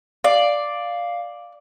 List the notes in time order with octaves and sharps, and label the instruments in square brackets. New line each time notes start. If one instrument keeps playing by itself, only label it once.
[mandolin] D5 [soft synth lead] F5